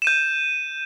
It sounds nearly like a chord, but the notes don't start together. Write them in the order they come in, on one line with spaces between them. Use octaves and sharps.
E7 D#7 G6